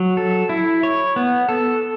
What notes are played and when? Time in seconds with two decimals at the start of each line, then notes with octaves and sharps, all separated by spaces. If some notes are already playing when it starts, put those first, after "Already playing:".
Already playing: F#3
0.17 A4
0.49 E4
0.83 C#5
1.16 B3
1.49 A4